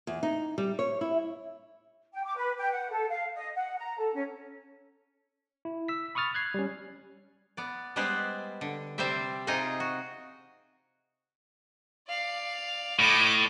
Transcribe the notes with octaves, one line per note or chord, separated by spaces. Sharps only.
E2
D#4
G3
C#5
E4
G5
D6
B4
G5
F#5
A4
F5
D#5
F#5
A#5
A4
C#4
E4
E6 B6
B5 C#6 D#6 F6 A6
F#6 G#6 C7
G3 C#4
B3 D5
G3 G#3 B3 B4 C5 D5
D3
C3 G3 C4 C5 D5 E5
C3 D#4 F4 G#4 D#5 G#5
F#4
D5 F5
A2 D#5 D6